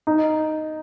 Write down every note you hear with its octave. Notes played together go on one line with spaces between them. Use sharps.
D#4